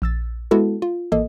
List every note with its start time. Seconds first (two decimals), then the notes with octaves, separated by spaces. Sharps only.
0.02 A#1 E6 A6
0.51 G#3 B3 E4 F#4 A4
0.82 F4
1.12 A1 A#3 A4 D#5